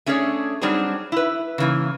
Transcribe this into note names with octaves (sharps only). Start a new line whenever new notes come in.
A3 C#4 D4 G#4 C#5
F#3 G3 C4 D4 D#4 G#4
E4 B4
C#3 E3 A#3